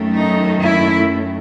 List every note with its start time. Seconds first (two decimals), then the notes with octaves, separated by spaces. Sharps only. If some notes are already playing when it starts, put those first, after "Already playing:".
Already playing: F#2 D#3 A3
0.16 D#4
0.63 E4